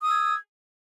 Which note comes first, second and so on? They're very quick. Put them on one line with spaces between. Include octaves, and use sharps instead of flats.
D#6 E6 G#6